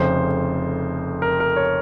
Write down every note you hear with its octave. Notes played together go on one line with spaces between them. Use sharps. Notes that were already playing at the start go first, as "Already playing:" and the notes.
Already playing: F1 F2 C#3 C5
A#4
A#4
C#5